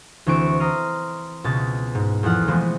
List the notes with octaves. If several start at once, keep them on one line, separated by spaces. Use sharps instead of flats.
D2 E3 C4 C#6 D7 E7
A#5 C6 D#6 F6
C#2 B2 A6
G#2
E2 F3 A4 F#5 F6
E3 F3 G#3 A3 B3 C4